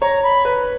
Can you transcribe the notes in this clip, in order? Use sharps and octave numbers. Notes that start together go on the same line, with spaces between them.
C#5 A#5
B5
B4